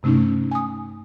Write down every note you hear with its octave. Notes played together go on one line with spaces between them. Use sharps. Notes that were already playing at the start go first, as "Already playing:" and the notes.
G2 C3 A3 C#4 D#4
G#5 D#6